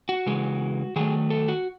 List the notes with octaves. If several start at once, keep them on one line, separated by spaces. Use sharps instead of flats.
F#4
C#3 E3 G#3
D#3 F#3 A3 G#4
A4
F#4